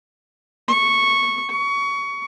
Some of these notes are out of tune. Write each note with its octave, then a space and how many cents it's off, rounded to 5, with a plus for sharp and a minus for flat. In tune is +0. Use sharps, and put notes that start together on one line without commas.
C#6 -5
C#6 +20